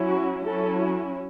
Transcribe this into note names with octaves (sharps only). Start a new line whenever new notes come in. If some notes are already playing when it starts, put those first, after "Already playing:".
Already playing: F#3 C#4 E4
F#4
F#3 C#4 E4 A4